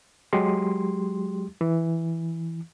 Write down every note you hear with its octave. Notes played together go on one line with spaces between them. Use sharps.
F#3 G#3 G4 C6
E3